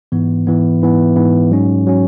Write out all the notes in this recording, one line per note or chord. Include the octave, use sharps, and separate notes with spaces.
G#2 E3 B3
G#2 E3 B3
G#2 E3 B3
G#2 E3 B3
G#2 F#3 C#4
F#3 C#4